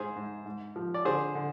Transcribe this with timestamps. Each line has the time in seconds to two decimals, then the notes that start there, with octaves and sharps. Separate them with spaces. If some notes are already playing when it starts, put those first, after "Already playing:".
Already playing: G#2 G#4 C5
0.16 G#2
0.46 G#2
0.76 F3
0.94 D5
1.05 D3 G#4 C5
1.35 D3